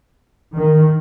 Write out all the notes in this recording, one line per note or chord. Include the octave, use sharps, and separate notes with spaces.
D#3